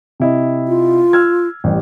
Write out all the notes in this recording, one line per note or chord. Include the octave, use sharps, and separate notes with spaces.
C3 E4 D#5
F4
E6 F6 G#6
A1 G3